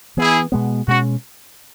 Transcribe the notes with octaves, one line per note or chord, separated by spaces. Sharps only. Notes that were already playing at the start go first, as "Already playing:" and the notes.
E3 B3 E4 G#4
B2 G#3 B3
B2 G#3 C#4 F#4